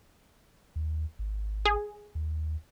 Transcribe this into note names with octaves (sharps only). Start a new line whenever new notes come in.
D#2
G#1
G#4
D#2